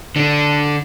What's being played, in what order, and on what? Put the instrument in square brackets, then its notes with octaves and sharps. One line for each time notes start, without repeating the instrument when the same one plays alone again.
[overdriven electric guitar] D3 D4